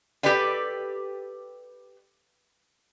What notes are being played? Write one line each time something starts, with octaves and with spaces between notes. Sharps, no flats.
G4 A4 B4 D5 G5